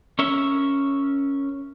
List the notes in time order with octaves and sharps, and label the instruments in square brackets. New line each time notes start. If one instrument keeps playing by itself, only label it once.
[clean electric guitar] C#4 A#4 C#5 E5